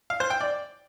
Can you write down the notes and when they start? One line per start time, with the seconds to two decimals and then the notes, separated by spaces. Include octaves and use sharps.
0.10 F5
0.20 C5
0.30 G5
0.41 D5